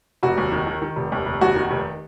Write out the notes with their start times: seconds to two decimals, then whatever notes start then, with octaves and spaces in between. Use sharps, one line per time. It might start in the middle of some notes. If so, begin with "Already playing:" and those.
0.23 F1 F#4
0.37 D#2
0.52 D#3
0.67 D#3
0.82 D#3
0.96 F1
1.12 D#2
1.26 F1
1.41 D#2 F#4
1.56 D#3
1.71 F1